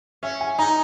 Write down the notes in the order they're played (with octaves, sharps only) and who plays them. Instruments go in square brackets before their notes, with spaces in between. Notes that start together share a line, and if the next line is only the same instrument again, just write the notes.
[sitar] C#4 [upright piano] E5
[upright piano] G#5
[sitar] D#4 [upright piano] A#5